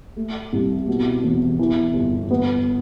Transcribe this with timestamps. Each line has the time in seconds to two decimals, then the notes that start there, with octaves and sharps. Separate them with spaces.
0.17 A3
0.53 C2
0.87 B2
1.24 E1
1.59 E3
1.94 G1
2.31 B3